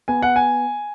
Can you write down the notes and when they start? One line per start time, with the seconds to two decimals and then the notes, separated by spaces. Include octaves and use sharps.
0.08 B3 G#5
0.22 F#5
0.36 G#5